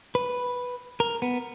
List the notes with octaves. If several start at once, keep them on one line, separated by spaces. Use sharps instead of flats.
B4
A#4
B3